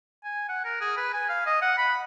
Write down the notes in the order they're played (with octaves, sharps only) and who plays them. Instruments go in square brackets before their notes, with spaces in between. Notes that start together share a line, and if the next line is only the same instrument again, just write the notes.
[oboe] G#5
F#5
A#4
G#4
B4
G#5
F5
D#5
F#5
B5